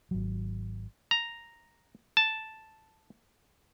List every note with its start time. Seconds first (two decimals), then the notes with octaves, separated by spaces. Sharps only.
0.11 G#1 F#3
1.11 A#5
2.17 A5